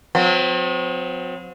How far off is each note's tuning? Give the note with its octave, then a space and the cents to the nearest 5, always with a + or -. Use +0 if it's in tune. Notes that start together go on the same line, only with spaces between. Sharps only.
F#3 -45 C4 -30